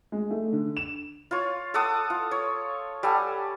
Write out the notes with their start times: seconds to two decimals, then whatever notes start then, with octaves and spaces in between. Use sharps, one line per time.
0.12 G#3
0.31 A3
0.52 D3
0.77 E7
1.31 F4 C#5
1.74 A4 F#5 D6 D#6
2.10 F4
2.31 C#5
3.03 G3 A4 F#5 G#5